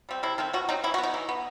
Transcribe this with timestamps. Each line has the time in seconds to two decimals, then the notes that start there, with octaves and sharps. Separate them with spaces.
0.09 G3 C4
0.23 C3 E4
0.38 D#3 A3 C4
0.53 B2 F#4
0.69 F#3 C4 D#4
0.84 E3 E4
0.94 F#4
0.98 B3
1.03 D#4
1.14 E3
1.29 B3